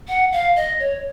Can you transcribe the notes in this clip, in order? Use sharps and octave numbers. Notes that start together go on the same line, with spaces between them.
F#5
F5
D#5
C#5